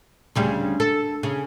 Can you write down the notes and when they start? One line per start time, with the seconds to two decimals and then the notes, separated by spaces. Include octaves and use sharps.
0.35 D2 C#3 G3
0.80 A4
1.23 C#3